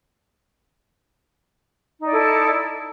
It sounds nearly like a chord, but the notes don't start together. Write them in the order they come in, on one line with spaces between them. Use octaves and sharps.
D#4 D5 E4 A4